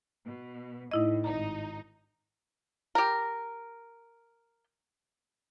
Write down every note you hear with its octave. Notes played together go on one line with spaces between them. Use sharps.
B2
A2 D#4 E4 D#5
G#1 D#4 A#5
G4 A#4